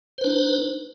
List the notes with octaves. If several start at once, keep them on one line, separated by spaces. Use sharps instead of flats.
D4 D#4 B4 C5